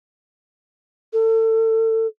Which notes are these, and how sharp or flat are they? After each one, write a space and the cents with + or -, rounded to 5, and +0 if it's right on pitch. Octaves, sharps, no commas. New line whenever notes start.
A4 +30